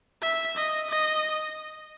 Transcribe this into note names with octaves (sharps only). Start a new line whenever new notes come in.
E5
D#5
D#5